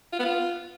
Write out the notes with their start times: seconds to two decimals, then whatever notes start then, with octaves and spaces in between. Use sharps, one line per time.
0.13 F4
0.19 B3
0.25 F4